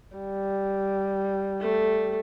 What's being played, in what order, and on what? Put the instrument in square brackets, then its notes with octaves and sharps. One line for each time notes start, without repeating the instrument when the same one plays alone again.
[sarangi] G3
[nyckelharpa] A3